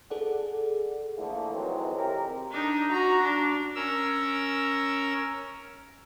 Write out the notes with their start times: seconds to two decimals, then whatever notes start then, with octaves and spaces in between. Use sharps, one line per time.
0.10 G#4 A4 D5 F#5
1.18 D3 E3 F3 A3 A#3
1.54 C3 D#3 E3 F#3 G#3 C4
1.96 F2 C4 G4 A#4
2.51 D4 D#4
2.92 F#4 A#5
3.23 D4
3.75 C#4 A#4 E6